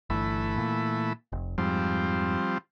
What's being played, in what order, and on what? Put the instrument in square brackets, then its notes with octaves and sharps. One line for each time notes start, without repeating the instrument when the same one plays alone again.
[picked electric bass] G1 [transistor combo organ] E3 A3 B5
[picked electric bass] A#2
F1
[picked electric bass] F2 G#2 [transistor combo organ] F3 G3 C4